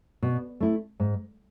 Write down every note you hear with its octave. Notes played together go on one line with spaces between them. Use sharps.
B2
A3 E4
G#2